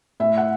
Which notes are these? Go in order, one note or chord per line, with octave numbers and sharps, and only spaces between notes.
A2 E5
F#5